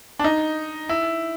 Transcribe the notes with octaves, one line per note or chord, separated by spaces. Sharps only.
D4
D#4
E4